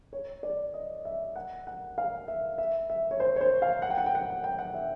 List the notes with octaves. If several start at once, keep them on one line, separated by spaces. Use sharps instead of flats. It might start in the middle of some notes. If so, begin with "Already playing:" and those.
C#5
D5
D#5
E5
F#5
F#5
F5
E5
E5
E5
C#5
C5
C#5
C5
F5
F#5
G5
F#5
G5
F#5
G5
F#5
E5